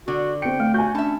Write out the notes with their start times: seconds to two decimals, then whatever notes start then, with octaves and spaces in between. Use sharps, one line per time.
0.08 D3 F#4
0.42 C4 G5 C#7
0.60 A3
0.74 F#4 G#5 G6
0.95 C#4 D4 E5 A5